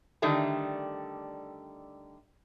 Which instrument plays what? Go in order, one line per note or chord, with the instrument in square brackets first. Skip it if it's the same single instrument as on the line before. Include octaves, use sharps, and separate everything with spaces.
[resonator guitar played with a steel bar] D3 D#3 G3 A3